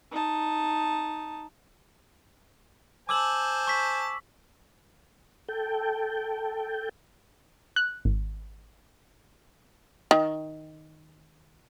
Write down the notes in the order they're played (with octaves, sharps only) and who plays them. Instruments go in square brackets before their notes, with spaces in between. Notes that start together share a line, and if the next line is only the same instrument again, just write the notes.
[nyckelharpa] D#4 A5
[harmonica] C5 G#5 A5 [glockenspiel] D6 E6 F#7
[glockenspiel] C#6 B6
[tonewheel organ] A4 G5
[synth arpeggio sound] F#6
G#1
[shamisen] D#3